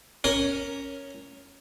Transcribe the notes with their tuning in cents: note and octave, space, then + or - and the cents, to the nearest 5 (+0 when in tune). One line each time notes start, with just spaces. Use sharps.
C#4 +0 A#4 +0